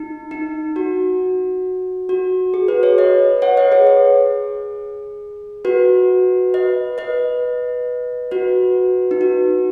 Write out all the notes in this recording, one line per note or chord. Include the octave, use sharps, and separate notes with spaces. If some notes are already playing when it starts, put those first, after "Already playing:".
Already playing: D#4
D#4
F#4
F#4
G#4
F#4 B4
G#4 C#5
B4 D#5
C#5 F#5
B4 D#5
G#4 C#5
G#4
F#4 B4
B4 D#5
B4 D#5
F#4 B4
D#4
F#4